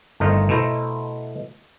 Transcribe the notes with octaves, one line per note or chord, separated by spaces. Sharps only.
G1 D#3 A3 A#4 C5 D#5
B2 A3 E4 C5 A#5